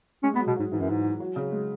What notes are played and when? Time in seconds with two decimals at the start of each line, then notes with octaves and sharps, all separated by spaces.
0.23 G#3 C#4
0.34 G#3 B3
0.39 F#3
0.47 B2
0.56 G#2 F#3
0.72 G#2 E3
0.80 F#2
0.90 G#2
1.20 F#3
1.36 C#3
1.52 G#3